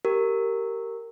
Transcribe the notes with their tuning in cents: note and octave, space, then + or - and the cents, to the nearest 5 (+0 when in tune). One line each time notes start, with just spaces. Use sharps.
G4 -10 A#4 -15